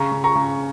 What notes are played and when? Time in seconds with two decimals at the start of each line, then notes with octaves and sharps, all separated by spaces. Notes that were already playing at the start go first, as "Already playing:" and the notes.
Already playing: C#3 A#5 C#6
0.12 C#3
0.24 A#5 C#6
0.35 C#3